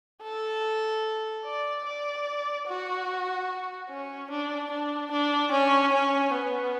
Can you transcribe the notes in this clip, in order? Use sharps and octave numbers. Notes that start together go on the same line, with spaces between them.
A4
D5
D5
F#4
C#4
D4
D4
D4
C#4
C#4
B3